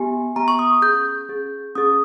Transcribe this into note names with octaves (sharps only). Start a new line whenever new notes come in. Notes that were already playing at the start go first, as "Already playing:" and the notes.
Already playing: B3 G4 G#5
B3 G4 A#5
C#6
D#6
C#4 G#4 G6
C#4 G#4
C#4 G#4 D#6